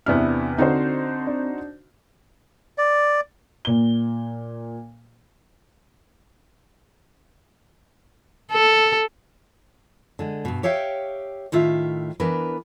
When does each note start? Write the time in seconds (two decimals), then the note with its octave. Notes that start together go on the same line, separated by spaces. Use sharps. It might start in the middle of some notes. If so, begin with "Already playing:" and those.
0.06 E2 C3 B3 D4 E4 F6
0.58 D3 C4 D#4 F#4 C5
1.27 D4
2.78 D5
3.65 A#2 G7
8.52 A4
10.19 D3 G#3
10.45 G2 B2
10.63 G4 C#5 E5 F5 G5
11.52 A2 D#3 F4 E5
12.20 E3 B3 D4 A#4 B4